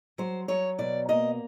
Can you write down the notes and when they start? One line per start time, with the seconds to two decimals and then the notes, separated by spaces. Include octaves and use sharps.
0.18 F#3 C5
0.48 F#3 C#5
0.78 B2 D5
1.09 A#3 D#5